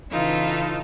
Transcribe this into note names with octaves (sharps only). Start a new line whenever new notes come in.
C#3 E3 D#4 F4 A4